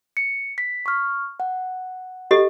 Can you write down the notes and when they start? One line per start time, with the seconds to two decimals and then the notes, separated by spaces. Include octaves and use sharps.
0.17 C#7
0.58 B6
0.86 C#6 F6
1.40 F#5
2.31 G4 A4 D#5